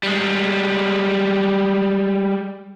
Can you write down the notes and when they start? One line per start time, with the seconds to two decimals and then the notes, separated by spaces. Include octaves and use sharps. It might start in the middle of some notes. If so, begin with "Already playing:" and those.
0.03 G3 G#3